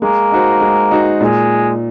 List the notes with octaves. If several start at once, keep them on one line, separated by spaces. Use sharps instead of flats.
G#3 A#3
D#4 F#4 C5
G#3
D#4 F#4 C5
A#2 G#3